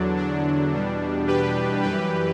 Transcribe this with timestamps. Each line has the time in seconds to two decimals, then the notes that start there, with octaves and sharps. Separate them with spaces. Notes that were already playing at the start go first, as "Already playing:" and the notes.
Already playing: E2 D3 F#3 D4
0.17 D4
0.73 E2 B2 G3
1.28 G4 B4
1.83 F#2 E3 G3 G4 B4